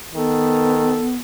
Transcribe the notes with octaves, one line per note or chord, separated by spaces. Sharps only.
D#3 B3 A4